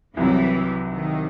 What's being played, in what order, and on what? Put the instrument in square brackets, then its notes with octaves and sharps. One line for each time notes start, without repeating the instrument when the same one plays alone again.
[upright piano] C2 C3 F#3 [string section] E3
[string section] D#3